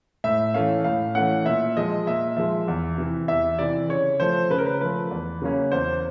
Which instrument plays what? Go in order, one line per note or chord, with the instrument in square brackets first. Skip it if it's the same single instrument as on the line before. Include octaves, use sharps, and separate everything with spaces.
[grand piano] A2 E5
E3 A3 C#4 F5
A2 F5
E3 A3 C#4 F#5
A#2 E5
F3 G#3 D#5
A#2 E5
F3 G#3 E5
E2
C3 E3
E2 E5
C3 E3 D5
C#3 C#5
F3 A3 C5
C#3 B4
A#4
B4
F3 A3 B4
E2
C#3 F#3 A#3 C#4
E2 C5